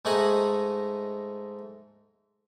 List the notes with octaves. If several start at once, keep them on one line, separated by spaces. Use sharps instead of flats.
G#2 A3 D#4 F#5 G#5 A#5